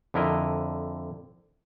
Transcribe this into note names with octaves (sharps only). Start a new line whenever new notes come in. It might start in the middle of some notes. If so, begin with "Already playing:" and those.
F2 D3 E4 A#4 D#5